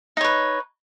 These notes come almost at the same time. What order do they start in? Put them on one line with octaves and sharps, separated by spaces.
D#4 C#5 B4